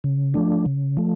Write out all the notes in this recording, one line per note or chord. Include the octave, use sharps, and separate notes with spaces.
C#3
F3 A3 D4
C#3
F3 A3